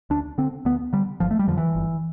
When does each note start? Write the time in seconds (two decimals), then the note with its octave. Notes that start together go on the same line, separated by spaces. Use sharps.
0.10 D2 D4
0.38 D3 C4
0.65 D2 B3
0.93 D3 G3
1.20 G1 F3
1.31 A3
1.39 G3
1.47 F2 D3 F3
1.57 E3
1.75 G1